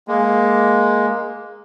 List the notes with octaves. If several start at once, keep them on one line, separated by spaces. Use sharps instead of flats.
G#3 A#3